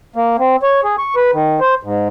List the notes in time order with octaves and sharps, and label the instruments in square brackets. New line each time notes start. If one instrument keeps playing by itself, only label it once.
[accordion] A#3
C4
C#5
G#4
C#6
B4
D#3
C5
G#2